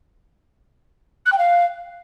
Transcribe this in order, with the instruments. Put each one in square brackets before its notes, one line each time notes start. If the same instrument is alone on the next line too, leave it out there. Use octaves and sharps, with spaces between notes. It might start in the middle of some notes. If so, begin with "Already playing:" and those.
[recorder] F#6
G5
F5